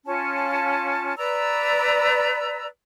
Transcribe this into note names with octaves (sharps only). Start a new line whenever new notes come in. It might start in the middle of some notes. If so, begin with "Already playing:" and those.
C#4 F4 A5
B4 D5 A#5 E6